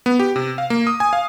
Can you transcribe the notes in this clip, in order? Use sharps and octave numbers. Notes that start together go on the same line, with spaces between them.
B3
G4
C3
F5
A#3
D#6
G#5
F5